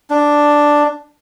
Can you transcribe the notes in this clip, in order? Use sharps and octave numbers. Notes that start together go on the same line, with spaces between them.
D4